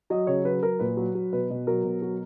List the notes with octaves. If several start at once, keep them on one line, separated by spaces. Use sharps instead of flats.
F#3 D#5
C#3 C#5
F#3 B4
F#3 A#4
A#2 B4
F#3
F#3
B2 B4
B2
F#3 A#4
B2
F#3